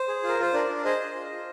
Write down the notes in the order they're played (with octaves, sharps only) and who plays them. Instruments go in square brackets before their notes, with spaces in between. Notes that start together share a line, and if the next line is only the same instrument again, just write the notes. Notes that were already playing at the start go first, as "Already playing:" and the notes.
Already playing: [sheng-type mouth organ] C5
G#4
F4
A#4
F4 C5
D4 A#4 D5
D4
G#4 C5 D#5
G#4
F4
F4